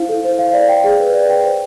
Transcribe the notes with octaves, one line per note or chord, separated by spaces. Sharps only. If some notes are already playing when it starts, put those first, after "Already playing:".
Already playing: E4 C5 F5
A4
C5
F5
D5
G5
G#4
B4
D5
G5
C5